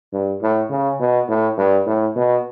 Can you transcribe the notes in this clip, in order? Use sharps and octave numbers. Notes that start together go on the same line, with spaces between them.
G2
A2
C#3
B2
A2
G2
A2
B2